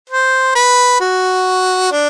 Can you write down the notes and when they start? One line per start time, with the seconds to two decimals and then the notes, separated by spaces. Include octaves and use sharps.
0.10 C5
0.55 B4
1.01 F#4
1.92 D4